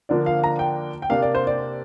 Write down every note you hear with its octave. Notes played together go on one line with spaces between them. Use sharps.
D3 F3 A#3 D4 D5
F5
A#5
G5
G5
C3 A#3 D4 F5
D5
C5
D5